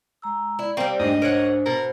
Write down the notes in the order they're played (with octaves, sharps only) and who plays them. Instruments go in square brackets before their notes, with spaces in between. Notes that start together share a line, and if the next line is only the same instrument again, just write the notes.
[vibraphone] G#3 A#5 E6
[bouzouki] E4 [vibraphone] D5
[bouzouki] G3 C4 [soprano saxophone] A#3
[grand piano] G#2 D4 [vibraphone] A3 [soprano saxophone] D#5
[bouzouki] A#4 C#5 F#5 [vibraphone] C5
[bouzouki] B2 [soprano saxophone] A#4